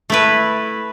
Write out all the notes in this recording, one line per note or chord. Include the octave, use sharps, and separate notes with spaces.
A3 E4 B4